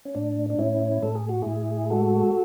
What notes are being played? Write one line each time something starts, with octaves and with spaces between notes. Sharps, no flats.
C#4
A2 D4
D4
A2 C#4 E4
A2 A4
G#4
F#4
A2 E4 G#4
G#3 F#4 A4